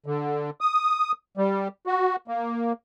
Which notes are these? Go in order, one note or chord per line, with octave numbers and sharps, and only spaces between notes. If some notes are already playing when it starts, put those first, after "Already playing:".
D3
D#6
G3
F#4
A#3